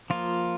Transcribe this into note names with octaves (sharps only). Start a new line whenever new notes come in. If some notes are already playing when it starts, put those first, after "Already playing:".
F3 A#3 F4